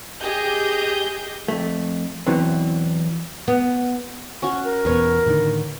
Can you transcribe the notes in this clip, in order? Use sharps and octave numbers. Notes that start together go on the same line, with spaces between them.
G4 G#4 D#5 G6
F2 A3
E2 B2 E3 F#3 C4
B3
C#4 F#4
A#4
E2 B2 B4 C#5
A2 D3 D#3